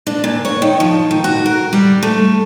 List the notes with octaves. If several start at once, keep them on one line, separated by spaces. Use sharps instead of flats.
D4
A#2
C#5
D#3
F3
D#3
F#4
A#4
G3
A3